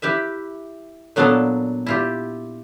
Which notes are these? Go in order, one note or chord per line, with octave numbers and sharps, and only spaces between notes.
E4 G4 B4 E5
A#2 F#3 B3 D4 A4 F5
E4 F4 G4